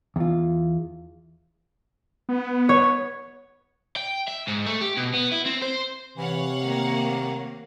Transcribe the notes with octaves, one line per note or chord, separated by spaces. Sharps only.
E2 F4
B3
C#5
G5
E5
G#2
A3
G4
B2
B3
E4
C4
C5
C3 E3 C#5 F5 F#5
D#3 A#3